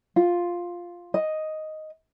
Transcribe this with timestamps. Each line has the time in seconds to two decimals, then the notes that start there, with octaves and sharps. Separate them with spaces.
0.16 F4
1.14 D#5